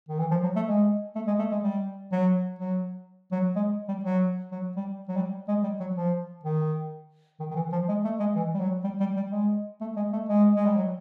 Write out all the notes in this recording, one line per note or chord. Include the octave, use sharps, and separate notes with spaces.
D#3
E3
F3
F#3
A3
G#3
A3
G#3
A3
G#3
G3
F#3
F#3
F#3
G#3
G3
F#3
F#3
G3
F#3
G3
G#3
G3
F#3
F3
D#3
D#3
D#3
E3
F3
G#3
A3
G#3
E3
G3
F#3
G3
G3
G3
G#3
A3
G#3
A3
G#3
G#3
G3
F#3